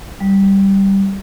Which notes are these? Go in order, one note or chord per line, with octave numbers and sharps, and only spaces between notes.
G3